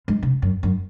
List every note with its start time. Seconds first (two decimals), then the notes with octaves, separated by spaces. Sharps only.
0.08 G#3
0.23 C3
0.42 F#2
0.63 F#2